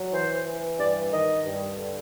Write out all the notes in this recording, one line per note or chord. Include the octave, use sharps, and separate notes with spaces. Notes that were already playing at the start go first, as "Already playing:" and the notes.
Already playing: F#3
E3 C5
E3
G2 D5
D#3 D#5
G2
D3